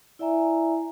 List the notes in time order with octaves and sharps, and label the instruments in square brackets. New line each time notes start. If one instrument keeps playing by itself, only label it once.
[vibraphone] E4 D5 E5 G#5 A#5